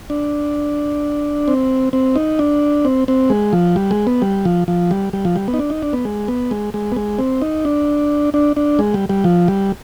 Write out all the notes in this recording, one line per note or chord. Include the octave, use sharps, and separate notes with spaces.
D4
C4
C4
D#4
D4
C4
C4
G#3
F3
G3
G#3
B3
G3
F3
F3
G3
G3
F3
G3
B3
D#4
D4
D#4
D4
B3
G#3
B3
G#3
G#3
B3
G#3
C4
D#4
D4
D4
D4
G#3
G3
G3
F3
G3